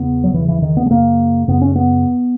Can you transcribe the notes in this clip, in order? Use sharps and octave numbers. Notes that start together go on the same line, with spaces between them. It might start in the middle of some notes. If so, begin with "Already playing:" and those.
Already playing: E2 C#3 B3
F#3
E2 C#3 E3
E3
D#3
B3
G#3
F#2 C#3 A#3
F#2 C#3 B3
C#4
B3